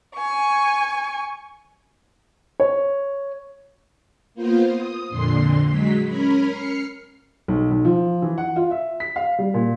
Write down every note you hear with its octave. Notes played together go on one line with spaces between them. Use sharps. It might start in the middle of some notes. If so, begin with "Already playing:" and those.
G#5 C#6
C#5
A#3 B3 F4 C5
D#6
F2 A#2 D3 C6 C7
F#3 G#3 B6
C#4 A#4 B5
F6 C7 C#7
B1
B1
F3
E3
F#5
F4
E5
B6
F5
G3
A#2